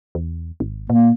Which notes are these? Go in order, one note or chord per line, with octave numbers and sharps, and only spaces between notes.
E2
G#1
A#2 A#3